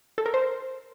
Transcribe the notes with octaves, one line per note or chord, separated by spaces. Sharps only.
A4
A#4
C5